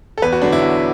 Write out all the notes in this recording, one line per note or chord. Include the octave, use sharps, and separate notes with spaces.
A4
E2 B4
F#4
D3 F#3 D4
E4
E2 F#4